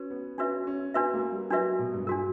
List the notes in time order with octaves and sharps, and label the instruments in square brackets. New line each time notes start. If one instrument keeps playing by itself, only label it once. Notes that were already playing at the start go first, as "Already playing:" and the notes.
Already playing: [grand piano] C#4 [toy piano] F#4 B4
[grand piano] B3
[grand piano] C#4 [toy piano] D4 F#4 B4 E5
[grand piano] C#4
[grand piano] B3 [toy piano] D4 F#4 B4 E5
[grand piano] A#3
G3
[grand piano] F#3 [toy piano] D4 F#4 B4 E5
[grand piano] B2
G2
[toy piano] D4 F#4 A#4